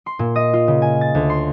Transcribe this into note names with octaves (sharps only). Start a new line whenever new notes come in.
C6
A#2
D#5
F4
C#3
G#5
A6
D2
C6